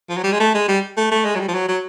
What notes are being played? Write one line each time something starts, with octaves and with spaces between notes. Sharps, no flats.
F3
F#3
G3
G#3
A3
G#3
G3
A3
A3
G#3
F#3
G3
F3
F#3
F#3